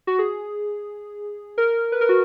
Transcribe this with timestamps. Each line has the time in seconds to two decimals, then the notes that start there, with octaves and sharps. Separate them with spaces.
0.07 F#4
0.19 G#4
1.58 A#4
1.92 B4
2.01 A#4
2.09 F#4